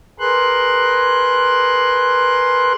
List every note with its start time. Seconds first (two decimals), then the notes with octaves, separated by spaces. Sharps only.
0.20 G#4 A#4 B4 C6 F#6